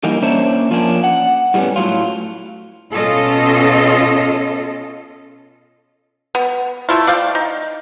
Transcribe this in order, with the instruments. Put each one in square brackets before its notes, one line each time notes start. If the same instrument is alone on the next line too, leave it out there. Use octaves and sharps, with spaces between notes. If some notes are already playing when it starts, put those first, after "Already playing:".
[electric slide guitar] D3 E3 G3 A#3 D#4
A#3 C#4 D4 C5 C#5 E5
F3 A#3 C#4 D4
F#5
A2 G3 A#3 B3 C#4
A2 F#3 F4
[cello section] B2 C#4 F4 A4 D#5
[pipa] B3
A3 E4 F4
D5 F5 G5
D#4